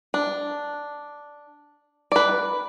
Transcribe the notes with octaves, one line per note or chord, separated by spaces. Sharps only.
D4
B4 D5